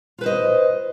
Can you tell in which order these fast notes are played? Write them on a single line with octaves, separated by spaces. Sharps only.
F4 B4 C5 D#5